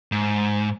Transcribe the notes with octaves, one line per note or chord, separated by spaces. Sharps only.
G#2